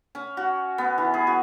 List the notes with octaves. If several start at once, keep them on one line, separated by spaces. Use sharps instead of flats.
C#4
F#4
B3
E3
G#4
F#4